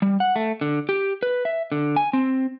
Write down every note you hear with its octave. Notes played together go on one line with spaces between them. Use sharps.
G3
F#5
A3
D3
G4
B4
E5
D3
G#5
C4